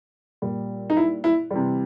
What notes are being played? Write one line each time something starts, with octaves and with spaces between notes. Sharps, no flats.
A#2 G3
D#4
E4
E4
C3 E3 G3